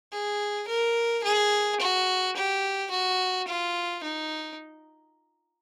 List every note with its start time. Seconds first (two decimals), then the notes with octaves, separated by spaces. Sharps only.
0.12 G#4
0.68 A#4
1.24 G#4
1.80 F#4
2.36 G4
2.91 F#4
3.48 F4
4.04 D#4